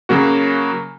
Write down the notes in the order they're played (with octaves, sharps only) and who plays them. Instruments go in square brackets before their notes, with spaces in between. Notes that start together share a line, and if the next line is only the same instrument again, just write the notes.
[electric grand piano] C#3 F#3 A#3 F#4